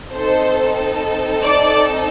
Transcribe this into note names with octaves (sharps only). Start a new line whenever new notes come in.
C4 D#4 A4 C5
D5